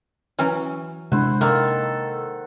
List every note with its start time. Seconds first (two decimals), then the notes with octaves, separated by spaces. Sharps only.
0.39 E3 F#3 C#4
1.12 C3 G#3 D4 E4 C5 F#5
1.41 D#3 A#3 A4